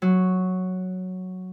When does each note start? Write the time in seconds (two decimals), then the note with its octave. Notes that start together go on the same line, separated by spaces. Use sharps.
0.02 F#3